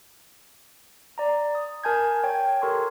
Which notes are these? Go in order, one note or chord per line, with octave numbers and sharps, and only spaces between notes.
D5 A#5
D#6
A#4 G#5 A5 G6 G#6
C#5 G5 G#6
G4 A4 A#4 C6 C#6